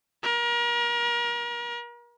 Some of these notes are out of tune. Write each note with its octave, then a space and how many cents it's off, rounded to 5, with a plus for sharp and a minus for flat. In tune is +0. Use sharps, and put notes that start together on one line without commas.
A#4 +35